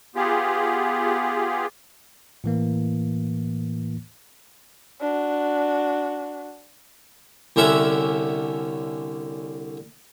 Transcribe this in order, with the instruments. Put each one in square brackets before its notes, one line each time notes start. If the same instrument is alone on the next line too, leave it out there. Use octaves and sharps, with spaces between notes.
[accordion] B3 F4 G4 G#4
[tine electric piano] A2 E3 A#3
[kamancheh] D4 F#4
[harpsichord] C2 D3 C#4 E5 F#5